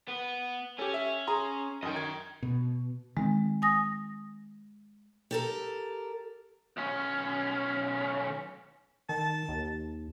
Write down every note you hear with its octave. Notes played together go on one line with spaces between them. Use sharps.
B3
C#4 G4 A4
E5
G#4 A#5 C6
F#2 D#3 D#5 G5
G#6
B2
D#3 G#3 C4
G#5 D#6 A#6
G4 A4 A#4
B1 C#4
D#3 A5
D#2